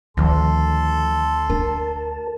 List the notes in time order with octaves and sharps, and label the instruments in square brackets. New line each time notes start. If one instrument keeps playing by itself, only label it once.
[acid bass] D2 [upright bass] D#3 F3 [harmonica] A4 C6
[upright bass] D4 [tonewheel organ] A#4 A5